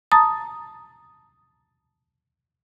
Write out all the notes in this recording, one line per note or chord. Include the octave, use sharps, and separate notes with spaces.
A5 A#5 D#6 A6